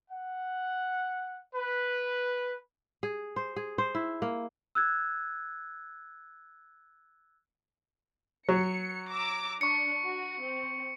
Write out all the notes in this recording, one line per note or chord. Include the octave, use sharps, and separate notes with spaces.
F#5
B4
G#4
C5
G#4
C5
E4
A#3
E6 F#6 G#6
F#3 C#7
A#5 D6 E6
D4 C#6 C#7
F#4
C4